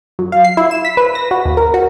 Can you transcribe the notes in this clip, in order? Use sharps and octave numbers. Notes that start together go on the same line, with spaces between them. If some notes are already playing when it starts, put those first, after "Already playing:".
F#2
F5
C7
E4
E7
B6
B4
A#6
F#4
D#2
A#4
F#4